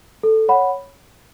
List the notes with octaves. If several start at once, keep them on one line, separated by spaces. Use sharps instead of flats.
A4
C#5 F#5 B5